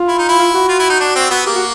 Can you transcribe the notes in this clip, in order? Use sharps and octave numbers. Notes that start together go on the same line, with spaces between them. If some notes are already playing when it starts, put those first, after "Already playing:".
Already playing: F4
E4
D#4
E4
F4
F#4
F4
E4
D#4
D4
C4
B3 F#4
A#3 G4
F#4